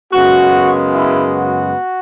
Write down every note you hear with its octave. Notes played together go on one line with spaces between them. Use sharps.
F#2 C#3 G#3 B3 F#4
E4
F#4